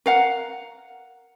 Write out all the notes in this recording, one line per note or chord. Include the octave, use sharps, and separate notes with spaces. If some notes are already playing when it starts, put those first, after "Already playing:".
A#4 F5 F#5